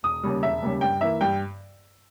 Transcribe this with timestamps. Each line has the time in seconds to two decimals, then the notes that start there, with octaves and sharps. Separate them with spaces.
0.03 E1 D#6
0.23 D#2 C#3 G3
0.43 E1 E5
0.62 D#2 C#3 G3
0.81 G2 G5
1.01 E3 A#3 E5
1.21 G2 G5